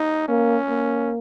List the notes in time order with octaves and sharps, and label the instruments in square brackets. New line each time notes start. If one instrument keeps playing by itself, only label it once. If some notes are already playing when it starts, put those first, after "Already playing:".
Already playing: [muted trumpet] D#4
[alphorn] A#3 [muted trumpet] C#4
[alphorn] A#3